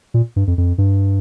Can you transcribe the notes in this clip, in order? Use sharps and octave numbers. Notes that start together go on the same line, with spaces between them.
A#2
G2
F2
F2
G2